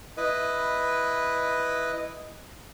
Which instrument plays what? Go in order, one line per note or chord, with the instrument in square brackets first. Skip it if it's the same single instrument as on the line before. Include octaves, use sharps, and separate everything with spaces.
[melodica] E4 B4 D#5